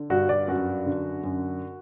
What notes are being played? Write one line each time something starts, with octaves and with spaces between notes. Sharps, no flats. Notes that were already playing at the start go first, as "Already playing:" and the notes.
Already playing: D3
G2 F#4
D5
F#2 F#4
D3
F#2